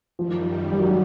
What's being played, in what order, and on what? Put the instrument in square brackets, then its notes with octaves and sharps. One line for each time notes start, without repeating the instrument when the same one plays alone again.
[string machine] F#2 D#3 G3 [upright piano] F3
[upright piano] G3
F#3